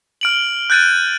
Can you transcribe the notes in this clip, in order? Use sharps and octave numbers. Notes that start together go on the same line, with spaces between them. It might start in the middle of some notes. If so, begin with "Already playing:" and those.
F6 D7 F#7
F#6 G6 A6 D7 D#7